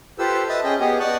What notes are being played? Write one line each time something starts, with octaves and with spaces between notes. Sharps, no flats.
F4 G4 A4 B4 C5 E6
B4 D#5 E5 A5 B5
C#4 G#4 D#5 G5
B3 G4 G#4 D#5
B3 D5 D#5 A5 C#6 F#6